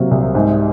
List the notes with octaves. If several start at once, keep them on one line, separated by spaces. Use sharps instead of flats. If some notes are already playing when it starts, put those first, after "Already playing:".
Already playing: C3 F#3 A#3
C2
G#2